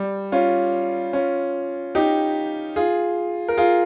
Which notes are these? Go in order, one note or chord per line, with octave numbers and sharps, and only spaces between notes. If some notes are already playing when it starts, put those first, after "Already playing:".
Already playing: G3
C#4 F4
C#4 F4
D#4 G4
F4 G#4
A#4
F4 G#4